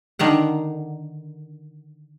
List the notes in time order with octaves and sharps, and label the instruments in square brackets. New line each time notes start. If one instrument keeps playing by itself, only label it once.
[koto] D3 D#3 A#4 F#5